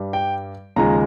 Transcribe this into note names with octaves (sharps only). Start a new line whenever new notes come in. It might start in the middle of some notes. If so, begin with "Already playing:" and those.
Already playing: G2 G3
G5
D#2 C#3 F3 G#3 A#5